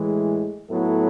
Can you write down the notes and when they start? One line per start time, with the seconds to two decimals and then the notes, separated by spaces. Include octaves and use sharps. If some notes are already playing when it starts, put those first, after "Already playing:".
Already playing: A2 E3 G#3
0.70 A2 F#3 B3 E4 A4